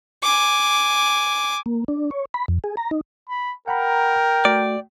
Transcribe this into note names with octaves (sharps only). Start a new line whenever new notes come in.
G#5 D6
A#3
D4
C#5
B5
F2
G#4
A#5
D#4
B5
A#4 F#5 G5 A#5 B5
A3 F#4 D5